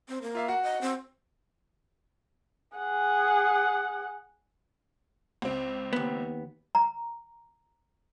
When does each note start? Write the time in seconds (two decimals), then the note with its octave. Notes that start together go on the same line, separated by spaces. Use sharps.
0.08 C4
0.22 A#3
0.35 F4 E5 F5
0.48 F#4 F#5
0.63 D#5
0.81 C4
2.77 G#4 F#5
5.42 C#2 C4
5.93 D#2 B3
6.75 A#5